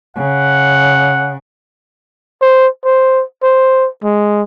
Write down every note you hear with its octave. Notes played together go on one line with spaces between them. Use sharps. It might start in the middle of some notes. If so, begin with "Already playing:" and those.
C#3 F#5
C5
C5
C5
G#3